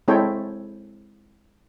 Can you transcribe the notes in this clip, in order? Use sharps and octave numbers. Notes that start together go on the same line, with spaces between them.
G#3 C4 E4 A4 C#5 G5